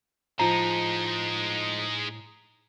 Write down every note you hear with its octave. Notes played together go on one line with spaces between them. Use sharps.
A2 F3 G#3 D#4 A#5